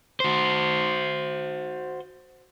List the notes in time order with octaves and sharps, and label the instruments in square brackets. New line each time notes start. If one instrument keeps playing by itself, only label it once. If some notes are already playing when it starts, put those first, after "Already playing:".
[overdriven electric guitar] F#4 C5